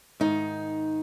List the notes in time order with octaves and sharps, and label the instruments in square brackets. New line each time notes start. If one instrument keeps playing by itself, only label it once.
[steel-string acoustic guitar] G#2 D#3 D#4